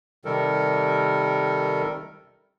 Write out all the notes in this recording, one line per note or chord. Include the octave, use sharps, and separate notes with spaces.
C3 D#3 G3 A4 A#4